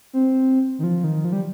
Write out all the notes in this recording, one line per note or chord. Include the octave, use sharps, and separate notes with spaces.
C4
D#3
F3
D#3
F3
G3